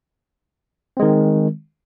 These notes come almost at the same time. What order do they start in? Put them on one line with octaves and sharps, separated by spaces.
C4 G#3 D#3